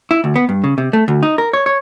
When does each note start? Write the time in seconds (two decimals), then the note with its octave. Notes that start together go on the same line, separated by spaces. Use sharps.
0.11 E4
0.24 D2
0.36 B3
0.49 G2
0.64 C#3
0.78 C3
0.93 A3
1.08 D2
1.23 D#4
1.38 A#4
1.53 C#5
1.66 C#5